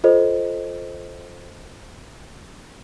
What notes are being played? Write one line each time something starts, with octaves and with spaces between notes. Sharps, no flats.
F4 A4 C5 D#5